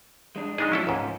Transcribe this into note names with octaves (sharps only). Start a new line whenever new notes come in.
G#3 D4
G#3 D4 D#4 G#4
A2 F3 F#3 C#4 E4 A4
C#2 G#2 F3 C#4